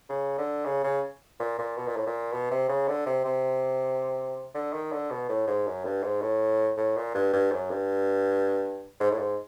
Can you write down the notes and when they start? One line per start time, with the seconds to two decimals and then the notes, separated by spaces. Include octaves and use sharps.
0.09 C#3
0.38 D3
0.65 C#3
0.84 C#3
1.40 A#2
1.59 A#2
1.77 B2
1.87 A#2
1.96 A2
2.07 A#2
2.32 B2
2.51 C3
2.69 C#3
2.88 D3
3.06 C3
3.25 C3
4.54 D3
4.73 D#3
4.92 D3
5.11 B2
5.29 A2
5.47 G#2
5.67 F#2
5.85 G2
6.03 G#2
6.22 A2
6.77 A2
6.97 A#2
7.15 G2
7.33 G2
7.52 F#2
7.71 G2
9.00 G#2
9.11 A2
9.18 G#2